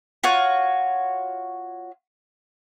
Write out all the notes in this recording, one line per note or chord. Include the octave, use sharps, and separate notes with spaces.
F4 F#4 C#5